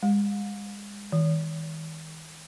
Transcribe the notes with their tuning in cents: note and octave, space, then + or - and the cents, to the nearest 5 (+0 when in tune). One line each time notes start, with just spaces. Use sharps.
G#3 -35
D#3 +35